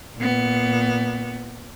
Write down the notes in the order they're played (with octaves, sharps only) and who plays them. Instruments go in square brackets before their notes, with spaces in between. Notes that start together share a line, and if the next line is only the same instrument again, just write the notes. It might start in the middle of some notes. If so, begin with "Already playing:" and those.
[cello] A#2 B3